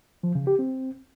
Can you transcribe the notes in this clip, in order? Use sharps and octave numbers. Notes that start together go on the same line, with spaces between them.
F3
C#3
G4
C4